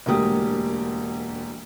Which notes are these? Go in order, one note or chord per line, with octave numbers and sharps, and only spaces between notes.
E1 D2 A#3 G4 D#6